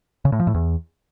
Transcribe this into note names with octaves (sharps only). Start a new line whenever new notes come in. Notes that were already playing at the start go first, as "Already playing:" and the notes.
C#3
A2
F3
A2
E2